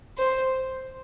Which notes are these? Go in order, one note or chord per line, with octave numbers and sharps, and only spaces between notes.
C5